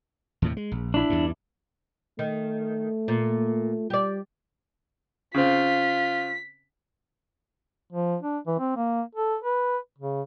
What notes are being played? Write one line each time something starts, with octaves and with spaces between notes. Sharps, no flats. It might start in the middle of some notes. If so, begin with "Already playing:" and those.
D#2 A2 C3
G#3
A#1
D4 E4
E2 G2
D#3 A3
A#2
G3 G4 D5
C#3 C4 F4 B6
F3
D4
E3
C4
A#3
A4
B4
C#3